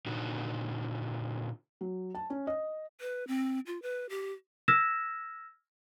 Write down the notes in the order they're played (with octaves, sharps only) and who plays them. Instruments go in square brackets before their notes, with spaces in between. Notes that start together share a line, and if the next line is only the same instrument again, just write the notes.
[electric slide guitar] A#2 D3 D#4 F#4
[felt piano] F#3
A5
C#4
D#5
[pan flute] B4
C4
F4
B4
G4
[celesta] E6 F6 G#6 A#6 B6 E7